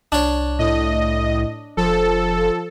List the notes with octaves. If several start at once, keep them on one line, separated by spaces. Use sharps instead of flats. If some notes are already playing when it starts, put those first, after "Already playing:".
C2 D4 C#5
A2 D#5
F1 F3 A4